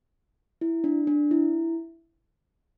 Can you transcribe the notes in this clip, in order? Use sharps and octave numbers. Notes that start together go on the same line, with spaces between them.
E4
D4
D4
E4